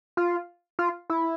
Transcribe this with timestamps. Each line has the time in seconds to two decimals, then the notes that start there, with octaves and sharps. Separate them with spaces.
0.17 F4
0.79 F4
1.10 E4